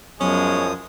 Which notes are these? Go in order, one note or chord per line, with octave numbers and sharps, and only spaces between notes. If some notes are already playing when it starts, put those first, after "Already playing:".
F#2 F3 F#3 G#3 B3 C#4 D#6